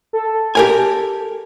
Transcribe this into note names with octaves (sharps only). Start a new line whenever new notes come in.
A4
G4 A#4 G#5